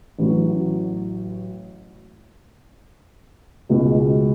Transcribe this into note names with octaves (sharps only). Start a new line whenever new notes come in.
A1 A2 F#3
C#2 B2 G#3